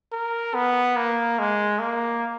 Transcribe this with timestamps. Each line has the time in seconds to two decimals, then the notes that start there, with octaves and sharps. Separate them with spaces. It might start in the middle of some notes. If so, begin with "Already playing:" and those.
0.12 A#4
0.54 B3
0.97 A#3
1.39 G#3
1.80 A#3